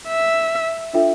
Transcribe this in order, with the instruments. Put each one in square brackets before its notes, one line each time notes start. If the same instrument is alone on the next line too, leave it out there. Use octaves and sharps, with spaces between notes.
[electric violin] E5
[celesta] D4 F4 A4 E5 G5